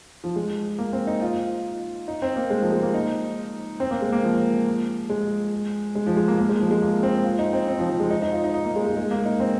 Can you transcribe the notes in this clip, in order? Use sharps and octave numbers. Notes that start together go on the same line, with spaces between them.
F3
G#3
A#3
C4
D#4
F4
D#4
C4
A#3
G#3
F3
G#3
A#3
D#4
C4
A#3
G#3
A#3
F3
G#3
G#3
F3
G#3
A#3
A#3
G#3
F3
G#3
A#3
C4
F4
D#4
C4
C4
F3
F3
G#3
D#4
D#4
F4
D#4
D#4
A#3
G#3
G#3
G#3
A#3
D#4
C4